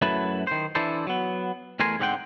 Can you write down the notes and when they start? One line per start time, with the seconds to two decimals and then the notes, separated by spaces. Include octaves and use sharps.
0.02 F#2 F#3 A3 E4 B4 A5
0.47 D#3 C5
0.75 E3 D4 E4 A4 C5
1.07 F#3 B3
1.80 E2 A3 A#4 G#5 C6
2.00 G#2 D3 B3 C4 F#5 G5